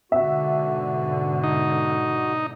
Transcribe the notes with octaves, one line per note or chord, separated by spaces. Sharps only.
G#2 B2 D3 F#4 E5 F#5
D#4